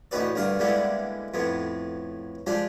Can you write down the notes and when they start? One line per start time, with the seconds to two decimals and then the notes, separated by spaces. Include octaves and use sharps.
0.11 A1 D2 D#4 G4 B4 D5
0.36 D2 G2 A#4 D5 F5
0.59 D3 G3 G#3 A#3 B3 E4
1.34 F2 A2 B3
2.47 F3 G#3 D4 G4